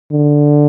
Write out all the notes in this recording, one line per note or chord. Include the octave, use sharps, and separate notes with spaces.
D3